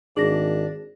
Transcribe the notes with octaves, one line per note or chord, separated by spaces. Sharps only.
G#1 D4 G#4 A#6